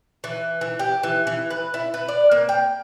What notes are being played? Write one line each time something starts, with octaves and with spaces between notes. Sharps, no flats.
E3
E3
G4
E3
E3
B4
E4
B4
D5
A#3
G5